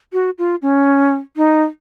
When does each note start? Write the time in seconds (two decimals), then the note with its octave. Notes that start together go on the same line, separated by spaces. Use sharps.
0.13 F#4
0.38 F4
0.62 C#4
1.37 D#4